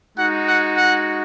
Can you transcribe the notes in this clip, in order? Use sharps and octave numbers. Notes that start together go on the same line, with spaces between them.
G#3 D#4 F#4 F#5
F#5
F#5